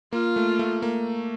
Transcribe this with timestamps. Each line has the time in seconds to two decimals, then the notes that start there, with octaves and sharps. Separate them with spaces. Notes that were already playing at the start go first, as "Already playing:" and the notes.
0.13 A#3 F4
0.36 A3
0.59 A3
0.82 A#3